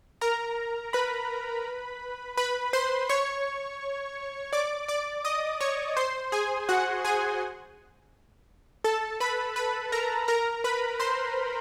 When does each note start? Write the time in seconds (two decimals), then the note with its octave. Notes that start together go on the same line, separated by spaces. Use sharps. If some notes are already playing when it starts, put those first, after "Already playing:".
0.21 A#4 A#5
0.93 B4 B5
2.37 B4 B5
2.73 C5 C6
3.09 C#5 C#6
4.53 D5 D6
4.88 D5 D6
5.25 D#5 D#6
5.60 C#5 C#6
5.97 C5 C6
6.32 G#4 G#5
6.69 F#4 F#5
7.05 G#4 G#5
8.84 A4 A5
9.20 B4 B5
9.56 B4 B5
9.92 A#4 A#5
10.28 A#4 A#5
10.64 B4 B5
11.00 C5 C6